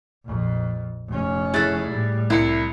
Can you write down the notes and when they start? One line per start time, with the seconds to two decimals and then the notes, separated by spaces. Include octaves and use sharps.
0.25 A#1 F2
1.09 F1 C#4
1.54 E4 G#4 A4 F#6 A6
1.88 A2 G3
2.30 C2 E4 B5 C#7